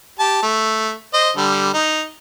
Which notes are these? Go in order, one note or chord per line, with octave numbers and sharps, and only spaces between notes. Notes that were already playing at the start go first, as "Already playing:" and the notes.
G4 A5
A3
C5 D#5
D3 G3
D#4